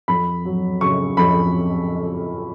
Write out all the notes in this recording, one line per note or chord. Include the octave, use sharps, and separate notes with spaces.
F2 B5
F#3
C#3 C#6
F2 B5